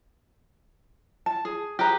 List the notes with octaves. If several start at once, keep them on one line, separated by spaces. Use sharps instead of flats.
A5
G#4
G4 G#4 B4 A#5